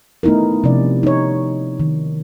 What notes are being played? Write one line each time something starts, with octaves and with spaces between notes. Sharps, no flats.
A3 B3 D#4 E4 A#4
C3 F3 C#4 D5
D#4 C#5
D#3